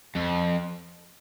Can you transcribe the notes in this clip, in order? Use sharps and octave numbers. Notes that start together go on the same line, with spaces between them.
F2